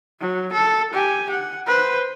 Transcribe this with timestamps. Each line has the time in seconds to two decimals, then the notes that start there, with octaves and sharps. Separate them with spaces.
0.20 F#3
0.53 A4
0.94 G4 G#5
1.30 F#5
1.67 B4 C5